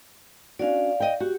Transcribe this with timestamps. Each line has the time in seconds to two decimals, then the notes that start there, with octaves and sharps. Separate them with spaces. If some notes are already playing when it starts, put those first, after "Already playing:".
0.59 C#4 D4 F#4 D5 F5
1.00 D#5 G5
1.20 F#4 G4